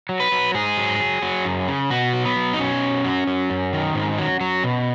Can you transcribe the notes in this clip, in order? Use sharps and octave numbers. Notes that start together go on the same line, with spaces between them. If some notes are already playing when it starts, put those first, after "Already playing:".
F#3
B4
F#3
G#2 G#4
F#3
F#3
F#3
F#2
C#3
B2 F#4
F#3
B3
F#3
D#4
B2 C#4
F#3
F#3
F#3
F#2
D#3
G#2
F#3
F#3
B2